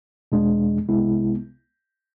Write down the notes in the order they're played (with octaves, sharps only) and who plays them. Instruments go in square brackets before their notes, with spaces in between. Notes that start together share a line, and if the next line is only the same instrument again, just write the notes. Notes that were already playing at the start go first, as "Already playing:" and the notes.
[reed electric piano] E2 B2 G#3 D4
C2 C3 G#3 B3 E4